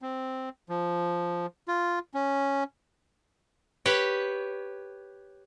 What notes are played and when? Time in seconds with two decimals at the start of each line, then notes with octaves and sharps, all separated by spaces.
0.02 C4
0.69 F3
1.68 F4
2.14 C#4
3.86 G4 B4 C#5